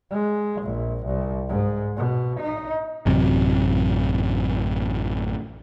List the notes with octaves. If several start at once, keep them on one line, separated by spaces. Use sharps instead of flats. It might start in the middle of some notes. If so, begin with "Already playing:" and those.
G#3
A#1
C2
G#2
B2
D#4
A1 F#2 C3